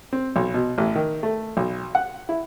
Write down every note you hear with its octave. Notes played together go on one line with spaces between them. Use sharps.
C4
B1
B2
A1
D#3
A3
B1
F#5
E4